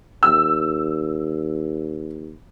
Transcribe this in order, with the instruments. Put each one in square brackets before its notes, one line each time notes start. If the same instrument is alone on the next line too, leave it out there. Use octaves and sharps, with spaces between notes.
[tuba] D#2 [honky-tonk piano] E6